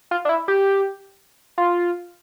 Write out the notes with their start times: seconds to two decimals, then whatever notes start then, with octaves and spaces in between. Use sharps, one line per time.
0.11 F4
0.25 D4
0.29 E4
0.48 G4
1.58 F4